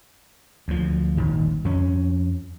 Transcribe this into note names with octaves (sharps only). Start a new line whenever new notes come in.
D2 F3
D#1 G#1 D#3
F2 C#4